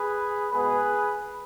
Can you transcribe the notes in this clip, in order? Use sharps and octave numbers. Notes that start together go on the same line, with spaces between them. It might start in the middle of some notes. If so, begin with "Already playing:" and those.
Already playing: G#4 B4
B2 G#3 B3 G#4 B4